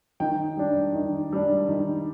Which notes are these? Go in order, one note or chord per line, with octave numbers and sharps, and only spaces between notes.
D#3 G5
G3 D4
D#3
G3 D4
D#3